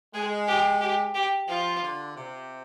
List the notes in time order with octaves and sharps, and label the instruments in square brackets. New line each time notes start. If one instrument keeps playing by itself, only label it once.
[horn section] G#3 [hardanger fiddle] G#4
[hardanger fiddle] G4
G4
G4
[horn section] F3 [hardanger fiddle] F4
[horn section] D3
C3